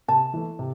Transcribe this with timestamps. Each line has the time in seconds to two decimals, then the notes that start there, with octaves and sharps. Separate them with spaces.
0.08 C3 A5
0.34 E3 A3
0.59 C3